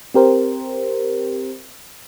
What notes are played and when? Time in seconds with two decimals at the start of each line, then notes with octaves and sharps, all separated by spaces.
0.14 C4 G4 A#4 C5